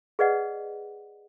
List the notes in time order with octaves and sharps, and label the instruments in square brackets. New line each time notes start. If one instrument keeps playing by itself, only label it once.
[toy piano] G#4 B4 D5 D#5 F#5